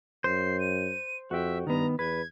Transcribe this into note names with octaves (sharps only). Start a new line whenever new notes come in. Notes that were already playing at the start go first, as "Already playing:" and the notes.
F#2 C5 C7
D#7
F2 F#4 E5 G5
G2 D#3 B3 A#5
E2 B4 G#6